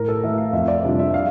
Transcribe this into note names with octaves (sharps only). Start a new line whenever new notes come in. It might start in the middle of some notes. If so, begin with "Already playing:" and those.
Already playing: A2 A#4
A4
E3 A3 E5
F5
F2 E5
D5
C3 G3 D4 F4
E5
F5